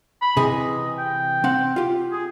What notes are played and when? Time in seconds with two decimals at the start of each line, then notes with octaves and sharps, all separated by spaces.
0.22 B5
0.37 C3 E3 G#4 D#5
0.98 G5
1.44 C4 F#5
1.76 F4 G4
2.12 G#4